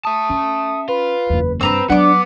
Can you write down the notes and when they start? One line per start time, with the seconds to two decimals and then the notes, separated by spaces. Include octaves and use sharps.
0.05 E5 A5 D#6
0.29 C#4
0.88 F4 B4
1.30 F#1 E2
1.61 G2 C4 B4 A#5 E6
1.90 F#3 G#3 B3 D4 F#5 D6